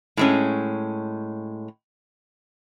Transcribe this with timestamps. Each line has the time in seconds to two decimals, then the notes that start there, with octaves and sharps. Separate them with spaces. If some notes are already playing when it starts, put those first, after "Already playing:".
0.17 A2 G#3 C#4